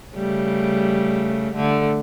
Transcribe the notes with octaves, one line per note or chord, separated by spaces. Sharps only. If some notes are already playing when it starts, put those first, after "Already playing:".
C#3 G3 A3
D3 A3